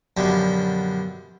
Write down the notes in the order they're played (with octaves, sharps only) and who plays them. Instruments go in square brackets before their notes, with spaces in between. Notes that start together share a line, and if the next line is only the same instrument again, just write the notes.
[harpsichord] F#2 B2 D3 F3 G3